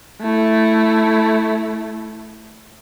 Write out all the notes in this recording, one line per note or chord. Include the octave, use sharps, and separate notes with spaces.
A3 E4